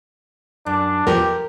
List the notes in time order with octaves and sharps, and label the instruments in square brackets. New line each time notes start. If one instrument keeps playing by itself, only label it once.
[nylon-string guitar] F#2 [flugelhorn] D4
[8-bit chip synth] E2 F3 [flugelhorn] G4 [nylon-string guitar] A#4